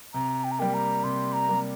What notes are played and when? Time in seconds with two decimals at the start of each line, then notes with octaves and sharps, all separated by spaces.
0.14 C3 A#5
0.44 G5
0.51 A#5
0.59 G3 A#3 G5
0.74 A#5
1.03 C3 C6
1.33 A#5
1.48 G3 A#3